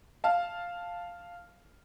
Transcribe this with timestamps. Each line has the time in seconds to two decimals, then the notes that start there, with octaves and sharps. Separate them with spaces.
0.24 F5 A5